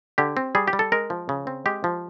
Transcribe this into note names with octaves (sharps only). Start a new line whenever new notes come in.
D3 G4
C4
G3 G#4
G4
G3
A4
G#3 A#4
F3
C#3
C4
G#3 G4
F3